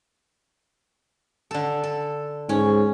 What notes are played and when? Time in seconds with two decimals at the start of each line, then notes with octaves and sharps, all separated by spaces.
1.51 D3 A4
1.83 A4
2.49 G#2 C#4